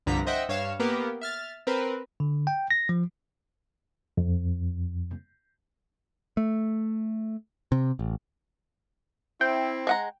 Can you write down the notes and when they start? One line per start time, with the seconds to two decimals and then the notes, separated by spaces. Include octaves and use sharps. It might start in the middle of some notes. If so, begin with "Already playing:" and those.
0.06 C2 G2 D3 F3 A#5 B6
0.27 C5 D#5 E5 F#5 G5
0.49 G2 C#5 F5 E7
0.80 A#3 B3 G4 A#4
1.21 E5 F6 A6
1.67 C4 A#4 B4
2.20 D3
2.47 G5
2.71 A#6
2.89 F3
4.18 F2
6.37 A3
7.72 C3
7.99 A1
9.41 C4 E4 G5
9.87 G#3 F#5 A#5